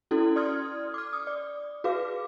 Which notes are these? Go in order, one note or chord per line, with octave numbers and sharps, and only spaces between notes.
C#4 E4 F#4 A4
D5 C6 D#6 F6 G#6
D6 F6
D#6
D5
F#4 G#4 B4 F5 D6